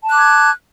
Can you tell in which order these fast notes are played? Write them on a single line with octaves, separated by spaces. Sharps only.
A5 F#6 D6 G#6